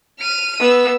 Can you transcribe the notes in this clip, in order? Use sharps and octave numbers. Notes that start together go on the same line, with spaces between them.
F6 D#7
B3 E6